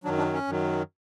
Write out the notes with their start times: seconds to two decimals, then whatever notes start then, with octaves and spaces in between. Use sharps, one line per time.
0.04 F#2 D#3 F#3 D4
0.18 D4
0.33 C#4
0.47 F#2 D#3 F#3